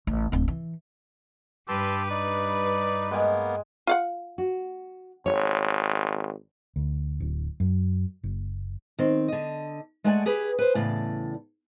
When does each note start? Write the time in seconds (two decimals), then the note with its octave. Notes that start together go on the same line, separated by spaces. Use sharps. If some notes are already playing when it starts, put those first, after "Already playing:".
0.07 A1
0.32 D1 C4
0.48 E3
1.68 G2 G4 B4 A5 C6 E6
2.10 D#4 D5
3.11 G#3 A#3 B3 G5 G#5
3.87 F4 F5 F#5
4.38 F#4
5.26 G#1 C#5
6.76 D2
7.20 D1
7.60 F#2
8.24 F#1
8.99 D#3 C4
9.28 D3 D#5
10.04 G#3 A3 D5 F#5 G#5
10.26 G4 G#4 B4
10.59 B4 C5
10.75 E2 A2 C#3 D5